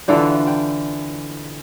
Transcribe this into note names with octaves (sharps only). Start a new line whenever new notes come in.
D3 E3 F4 A4
G5